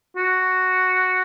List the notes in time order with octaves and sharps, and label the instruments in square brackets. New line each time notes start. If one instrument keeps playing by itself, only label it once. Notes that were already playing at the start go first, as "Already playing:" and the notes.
[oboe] F#4